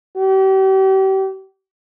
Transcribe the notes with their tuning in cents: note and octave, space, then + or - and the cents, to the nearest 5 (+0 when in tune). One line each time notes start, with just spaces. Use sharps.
G4 -40